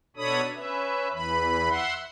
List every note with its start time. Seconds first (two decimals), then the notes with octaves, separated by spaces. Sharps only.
0.16 B2 D4 A4 C#5 B5 D#6
0.56 C#4 B4 E5
1.13 E2 E3 B4 B5
1.69 E5 F#5 C6